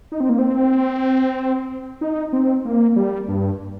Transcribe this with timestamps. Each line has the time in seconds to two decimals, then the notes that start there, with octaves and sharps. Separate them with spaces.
0.12 D#4
0.20 C4
0.29 A#3
0.39 C4
2.01 D#4
2.33 C4
2.65 A#3
2.96 G3
3.28 G2